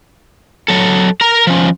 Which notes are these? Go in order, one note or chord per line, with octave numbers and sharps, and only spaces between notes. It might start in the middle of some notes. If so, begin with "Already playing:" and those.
F#3 A4
A#4 A#5
F3 C#4